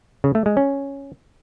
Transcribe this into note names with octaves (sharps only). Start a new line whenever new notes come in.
C#3
A3
G#3
C#4